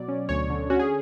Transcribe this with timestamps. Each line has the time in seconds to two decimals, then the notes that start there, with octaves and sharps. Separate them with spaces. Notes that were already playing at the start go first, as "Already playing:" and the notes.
Already playing: B2 F#3 D5
0.08 C#4
0.29 D2 C#5
0.50 D3
0.70 C#4 F#4
0.79 G#4